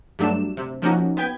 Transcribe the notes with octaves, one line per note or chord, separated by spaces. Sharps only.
G2 F#3 A3 D4 E7
C3
F3 A#3 C#4 D#4 F#4
B3 B4 G5 G6 G#6